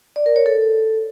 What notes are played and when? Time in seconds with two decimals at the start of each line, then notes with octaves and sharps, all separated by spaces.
0.16 D5
0.26 A#4
0.36 C#5
0.46 A4